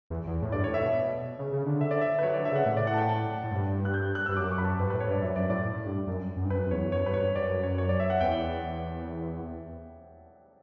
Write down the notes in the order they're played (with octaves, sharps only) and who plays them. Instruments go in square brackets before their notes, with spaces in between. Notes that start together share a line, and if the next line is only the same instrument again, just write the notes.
[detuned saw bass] E2
E2
A2
[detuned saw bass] G2 [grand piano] D5
[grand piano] C#5
[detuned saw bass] A2
[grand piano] E5
[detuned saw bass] B2
C#3
C#3
D3
[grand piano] E5
D5
E5
B4
[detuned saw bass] F#3 [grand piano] C#5
[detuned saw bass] E3 [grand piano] D5
[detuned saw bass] D3
[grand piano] E5
[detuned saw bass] C#3 [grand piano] F#5
[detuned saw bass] A2 [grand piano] E5
[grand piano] D5
F#5
A5
G5
A5
[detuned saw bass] A2
G2
[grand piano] F#6
G6
F#6
[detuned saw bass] G2 [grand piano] E6
[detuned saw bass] F#2 [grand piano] D6
[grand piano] C#6
[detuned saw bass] F#2 [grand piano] B5
[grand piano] A5
[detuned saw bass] G2 [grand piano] B4
[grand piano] B4
[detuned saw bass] A2
[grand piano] C#5
[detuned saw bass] G2 [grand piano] D5
[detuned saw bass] F#2 [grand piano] E5
[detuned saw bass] F#2 [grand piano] D5
[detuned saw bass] A2 [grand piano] D5
[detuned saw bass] A2
G2
F#2
F#2
G2
[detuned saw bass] F#2 [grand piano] B4
[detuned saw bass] F#2
[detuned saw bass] E2 [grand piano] C#5
[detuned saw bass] F#2 [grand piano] C#5
[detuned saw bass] G2 [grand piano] B4
[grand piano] C#5
[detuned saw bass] G2
[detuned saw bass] F#2 [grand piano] D5
[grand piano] C#5
C#5
D5
E5
F#5
[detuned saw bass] E2 [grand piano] G5